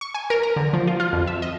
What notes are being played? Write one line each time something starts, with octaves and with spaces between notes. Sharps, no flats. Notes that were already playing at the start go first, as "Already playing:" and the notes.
C#6
G#5
A#4
A#5
D3
F3
F4
F4
F2
E5
D#5